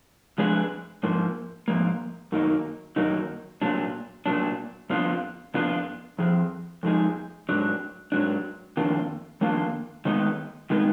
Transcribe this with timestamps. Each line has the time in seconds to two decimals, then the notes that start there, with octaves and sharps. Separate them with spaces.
0.38 F3 G#3 D4 G#4 B4
1.03 G#2 F3 A#3
1.68 G#2 F3 A#3
2.32 F#2 D#3 F#3 A#3 D#4
2.96 F#2 D#3 F#3 A#3 D#4
3.62 A#2 F#3 D4
4.26 A#2 F#3 D4
4.90 F2 F3 B3 D4 F4
5.54 F2 F3 B3 D4 F4
6.19 F2 F3 G#4
6.83 F2 F3 G#3 D#4 G#4
7.49 G#2 F#3 D4
8.12 G#2 F#3 D4
8.77 F2 D#3 A#3 D4 F4
9.41 F2 D#3 A#3 D4 F4
10.05 D#3 G#3 B3 D#4
10.70 D#3 G#3 B3 D#4